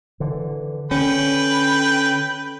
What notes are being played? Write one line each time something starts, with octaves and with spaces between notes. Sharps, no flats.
D3 E3
D3 C#4 B4 G5